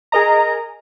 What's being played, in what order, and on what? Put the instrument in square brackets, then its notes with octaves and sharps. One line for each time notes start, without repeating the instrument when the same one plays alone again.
[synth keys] G#4 A#4 D#5 A#5